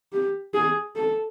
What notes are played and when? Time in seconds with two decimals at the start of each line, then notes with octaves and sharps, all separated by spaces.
0.12 G4
0.54 G#4
0.96 A4